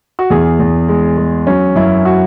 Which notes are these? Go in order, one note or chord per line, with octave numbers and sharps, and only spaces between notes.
F#4
E2 G#4
E2
G#3
G#3
F#3 C#4
F#2 E4
F#4